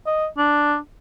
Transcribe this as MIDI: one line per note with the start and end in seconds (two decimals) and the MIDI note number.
0.06 0.27 75
0.38 0.77 62